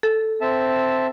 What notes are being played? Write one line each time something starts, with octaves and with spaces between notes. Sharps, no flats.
A4
C4 E5 A5